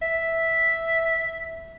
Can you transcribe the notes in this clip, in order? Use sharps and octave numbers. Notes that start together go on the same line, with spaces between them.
E5